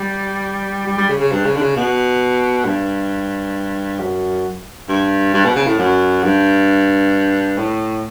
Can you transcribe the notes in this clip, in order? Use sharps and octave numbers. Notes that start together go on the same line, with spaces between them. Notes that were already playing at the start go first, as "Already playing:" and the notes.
Already playing: G3
G3
G3
C#3
C#3
G2
C#3
D3
C#3
B2
G2
F#2
G2
G2
B2
C#3
A2
F#2
G2
A2